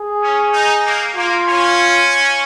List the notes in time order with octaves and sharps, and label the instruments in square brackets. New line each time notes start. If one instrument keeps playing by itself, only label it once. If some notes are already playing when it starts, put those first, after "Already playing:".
Already playing: [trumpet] G#4
[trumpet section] C#4
D#4
A#3
[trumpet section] A#3 [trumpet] F4
[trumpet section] C#4